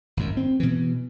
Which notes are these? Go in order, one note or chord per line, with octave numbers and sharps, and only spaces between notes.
G#1 F#2
C4
B2 E3